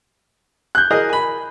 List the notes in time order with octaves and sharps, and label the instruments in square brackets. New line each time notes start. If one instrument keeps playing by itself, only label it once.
[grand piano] F#6 G6
[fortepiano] G#4 A#4 D#5
G#5 B5